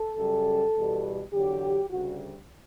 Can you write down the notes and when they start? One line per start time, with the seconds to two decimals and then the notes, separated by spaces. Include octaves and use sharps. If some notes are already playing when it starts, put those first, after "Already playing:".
Already playing: A4
0.17 F#2 C#3 G3
0.75 E2 B2 G3
1.33 E2 D3 F#3 G4
1.90 D2 C#3 G3 F#4